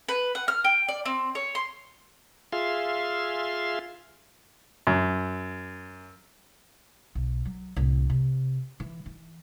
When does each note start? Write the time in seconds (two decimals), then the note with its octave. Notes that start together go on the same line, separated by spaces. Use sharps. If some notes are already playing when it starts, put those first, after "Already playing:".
0.09 B4
0.35 F#5
0.48 F6
0.65 G5
0.88 D5
1.05 C4
1.35 C#5
1.55 C6
2.53 F4 G#4 E5 F5 C6
4.87 F#2
7.15 B1
7.45 F#3
7.76 C2 A2
8.10 C3
8.80 E3
9.06 E3